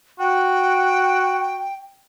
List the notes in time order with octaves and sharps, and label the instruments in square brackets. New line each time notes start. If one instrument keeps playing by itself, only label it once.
[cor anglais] F#4 [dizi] G5